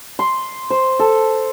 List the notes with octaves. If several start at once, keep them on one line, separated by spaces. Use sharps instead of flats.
C6
C5
A4